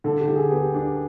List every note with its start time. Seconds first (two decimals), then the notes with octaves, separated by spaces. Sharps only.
0.04 D3 A4
0.20 G4
0.28 D3
0.36 G#4
0.51 B3 G4
0.74 D4